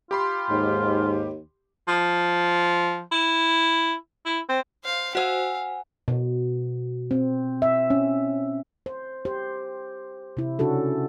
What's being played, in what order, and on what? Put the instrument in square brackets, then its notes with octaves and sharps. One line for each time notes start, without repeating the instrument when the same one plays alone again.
[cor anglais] F4 [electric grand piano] G4 B5 C6
[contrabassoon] D#2 [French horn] G#2
[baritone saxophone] F3
E4
E4
C4
[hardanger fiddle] C5 F5
[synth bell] F#4 C5 [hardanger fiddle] F5 [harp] F#5 G#5 E6
[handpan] B2
C4
E5
C#4
C5
G4 C5
C3 E4
C#3 C#4 D4 F#4 A4